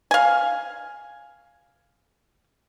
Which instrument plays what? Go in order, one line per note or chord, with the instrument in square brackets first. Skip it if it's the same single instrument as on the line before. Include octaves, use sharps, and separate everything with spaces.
[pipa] F5 G#5